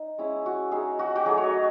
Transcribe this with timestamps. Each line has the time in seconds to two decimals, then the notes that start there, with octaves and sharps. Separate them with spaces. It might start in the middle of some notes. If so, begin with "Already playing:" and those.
Already playing: D#4
0.18 G#3 C#4 E4
0.46 F#4
0.72 G#3 D#4 G#4
0.99 F#4
1.16 F#4
1.26 F#3 A3 D#4 G#4
1.38 C#5
1.44 D#5